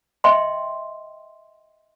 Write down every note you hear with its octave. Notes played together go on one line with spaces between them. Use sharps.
D#5 E5 G5 C6